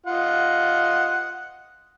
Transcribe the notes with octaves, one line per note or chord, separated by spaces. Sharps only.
F4 D#5 F#5